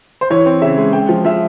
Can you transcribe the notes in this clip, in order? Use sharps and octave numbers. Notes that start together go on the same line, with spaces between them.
C5
E3 C#5
C4
C#3 E5
G#3
G#3 G5
F3
F3 E5